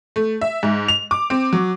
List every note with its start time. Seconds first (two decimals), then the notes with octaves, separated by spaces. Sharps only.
0.16 A3
0.41 E5
0.63 G#2
0.88 F7
1.11 D6
1.30 C4
1.53 F#3